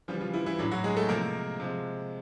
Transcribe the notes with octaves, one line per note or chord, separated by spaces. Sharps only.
C#3 E3 F3 G3 F4
F3 F4
E3 E4
E3 E4
A2 F#3 D4
F#3 F#4
G#3 G#4
A3 A4
C3 F3 G#3 A#3 A#4
C3 F3 G#3